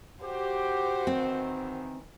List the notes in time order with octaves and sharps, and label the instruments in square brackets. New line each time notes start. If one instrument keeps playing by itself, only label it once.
[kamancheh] F#4 C5 [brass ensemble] G4
[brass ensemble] D#3 E3 [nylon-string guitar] C4